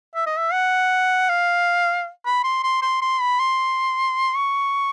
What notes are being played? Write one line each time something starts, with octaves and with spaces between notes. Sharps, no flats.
E5
D#5
E5
F#5
F5
B5
C6
C6
C6
C6
B5
C6
C#6